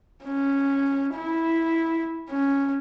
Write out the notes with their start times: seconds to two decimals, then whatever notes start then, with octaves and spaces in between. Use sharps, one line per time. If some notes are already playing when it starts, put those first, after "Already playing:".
0.25 C#4
1.14 E4
2.30 C#4